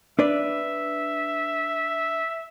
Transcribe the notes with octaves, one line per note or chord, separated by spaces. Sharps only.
D4 B4 D5 E5